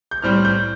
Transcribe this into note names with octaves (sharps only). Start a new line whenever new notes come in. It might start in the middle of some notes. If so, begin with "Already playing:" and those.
G6
A2 G3 C4 F6
G6